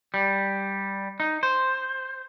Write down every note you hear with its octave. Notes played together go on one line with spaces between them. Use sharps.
G3
D#4
C5